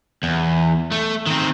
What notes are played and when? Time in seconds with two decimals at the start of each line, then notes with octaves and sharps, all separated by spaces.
0.23 E2
0.92 A3
1.26 D#3 C4